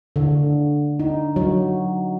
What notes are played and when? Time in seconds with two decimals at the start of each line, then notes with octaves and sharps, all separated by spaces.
0.16 D3
1.00 D#4
1.36 F#3